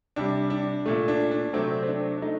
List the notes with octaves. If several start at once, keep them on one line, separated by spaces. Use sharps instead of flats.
C3 G3 D4
D4
A#2 A3
D4
D4
C3 F#3 A3 C4
C4
D4
D4
A3 D#4